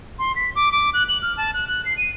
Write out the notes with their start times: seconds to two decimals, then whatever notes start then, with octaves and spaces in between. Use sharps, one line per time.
0.19 C6
0.36 B6
0.56 D6
0.72 D6
0.94 F#6
1.08 F#7
1.22 F6
1.37 A5
1.54 F#6
1.68 F#6
1.85 C7
1.98 D#7